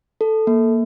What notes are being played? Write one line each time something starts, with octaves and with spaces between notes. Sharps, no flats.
A4
A#3